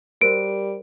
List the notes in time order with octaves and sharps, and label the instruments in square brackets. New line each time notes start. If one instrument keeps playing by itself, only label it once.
[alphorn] G3 [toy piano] F#4 A#4 C5 [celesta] D7